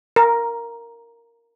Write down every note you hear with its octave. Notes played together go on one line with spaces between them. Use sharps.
A#4